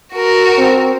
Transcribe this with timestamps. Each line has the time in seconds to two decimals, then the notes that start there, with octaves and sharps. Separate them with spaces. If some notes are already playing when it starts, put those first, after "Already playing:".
0.13 F#4 A#4
0.58 C4